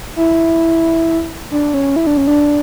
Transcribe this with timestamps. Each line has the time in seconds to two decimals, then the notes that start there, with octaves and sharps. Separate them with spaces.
0.16 E4
1.51 D4
1.74 C#4
1.96 E4
2.07 D4
2.17 C#4
2.27 D4